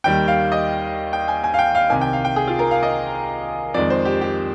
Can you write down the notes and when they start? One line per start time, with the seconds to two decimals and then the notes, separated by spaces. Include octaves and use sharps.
0.04 D#2 D#3 G3 G5
0.28 F5
0.52 D#5
1.13 G5
1.28 G#5
1.44 G#5
1.54 F5
1.59 G5
1.75 F5
1.90 C2 C3 D#3 G#5
2.01 G5
2.13 F5
2.25 G5
2.36 G#4
2.47 F4
2.59 A#4
2.71 F5
2.83 D#5
3.74 F2 D#3 G#3 D5
3.90 C5
4.05 G4
4.21 G4